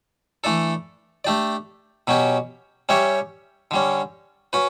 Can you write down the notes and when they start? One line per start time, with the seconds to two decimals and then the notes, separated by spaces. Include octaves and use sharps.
0.44 E3 A3 D4 A4
1.25 A3 D4 G4 D5
2.07 B2 F#3 C#4 G4
2.89 G3 C#4 G4 C#5 E5
3.71 D3 G3 C#4
4.53 C#4 F#4 B4